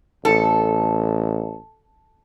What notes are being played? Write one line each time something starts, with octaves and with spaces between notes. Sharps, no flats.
A1 A4